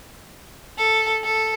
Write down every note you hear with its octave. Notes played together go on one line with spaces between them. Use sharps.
A4
A4